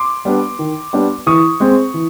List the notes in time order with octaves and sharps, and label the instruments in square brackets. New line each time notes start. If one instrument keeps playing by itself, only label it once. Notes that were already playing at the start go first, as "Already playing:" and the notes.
Already playing: [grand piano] C6 D6
G3 B3 D4
D#3
G3 B3 D4
E3 C#6 D#6
G#3 C4
E3